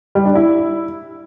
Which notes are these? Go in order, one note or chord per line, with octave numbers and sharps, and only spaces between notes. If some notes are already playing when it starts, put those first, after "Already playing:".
G3
D4
E4